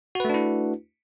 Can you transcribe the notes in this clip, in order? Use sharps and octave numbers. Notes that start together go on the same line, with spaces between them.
A3 D4 E4 F#4 B4